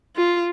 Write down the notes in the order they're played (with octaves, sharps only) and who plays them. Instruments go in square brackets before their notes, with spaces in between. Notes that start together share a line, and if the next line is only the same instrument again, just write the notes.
[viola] F4